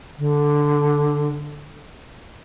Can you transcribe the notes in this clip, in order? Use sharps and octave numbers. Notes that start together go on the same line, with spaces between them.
D3